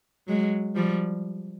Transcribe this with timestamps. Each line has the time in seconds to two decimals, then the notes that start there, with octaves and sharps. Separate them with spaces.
0.28 F#3 G#3
0.76 F3 G3